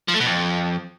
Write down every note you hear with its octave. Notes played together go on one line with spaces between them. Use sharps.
F3
A3
B2
F2